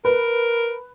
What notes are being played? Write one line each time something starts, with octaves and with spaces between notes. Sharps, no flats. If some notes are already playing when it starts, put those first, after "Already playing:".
A#4 B4